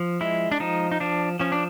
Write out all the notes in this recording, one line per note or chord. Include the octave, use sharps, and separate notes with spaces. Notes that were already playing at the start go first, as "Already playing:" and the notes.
Already playing: F3
G#3 E4
D4
F3 D#4
D#4
F3 D4
F3 C#4
D4